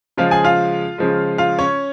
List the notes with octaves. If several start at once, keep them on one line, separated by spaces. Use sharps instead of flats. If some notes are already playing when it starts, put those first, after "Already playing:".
C#3 F3 G#3 F4 F5
G#4 G#5
F4 F5
C#3 F3 G#3
F4 F5
C#4 C#5